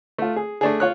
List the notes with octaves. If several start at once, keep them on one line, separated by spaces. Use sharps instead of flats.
A3 F4
G#4
A3 D4 G#4
F4 C#5 F#6